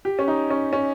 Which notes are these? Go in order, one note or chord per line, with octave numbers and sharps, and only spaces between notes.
G4
C#4
D#4
C#4
C#4